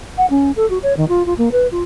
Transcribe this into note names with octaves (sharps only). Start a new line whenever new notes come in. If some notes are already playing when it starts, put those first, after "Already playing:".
F#5
C#4
A4
F#4
C#5
D#3
F4
F4
A#3
B4
F4